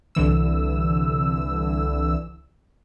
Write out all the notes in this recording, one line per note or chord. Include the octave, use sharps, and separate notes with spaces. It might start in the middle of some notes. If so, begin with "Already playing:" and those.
C2 D3 E3 E6